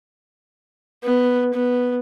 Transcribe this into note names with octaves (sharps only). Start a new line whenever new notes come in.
B3
B3